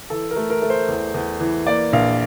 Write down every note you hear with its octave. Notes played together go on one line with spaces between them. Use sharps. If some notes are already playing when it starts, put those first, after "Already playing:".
E3 A4
A#4
A3
A#4
A3
C5
E2
E2
E3
A#3 D5
A#1 F5